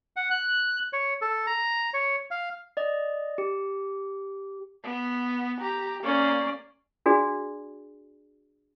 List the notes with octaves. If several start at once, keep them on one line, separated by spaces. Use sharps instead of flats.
F#5
F#6
C#5
A4
A#5
C#5
F5
D5 D#5
G4
B3
G4 A#5
A#3 C#4 D5
D4 F#4 G#4 D5